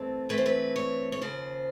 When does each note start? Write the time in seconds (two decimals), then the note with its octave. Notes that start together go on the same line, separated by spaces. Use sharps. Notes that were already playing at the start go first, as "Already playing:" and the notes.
Already playing: G2 E3 A3 C4 A4
0.29 G2 E3 A3 C4 B4
0.38 C5
0.46 B4
0.76 C#5
1.12 C#5
1.21 D#2 C#3 F3 C5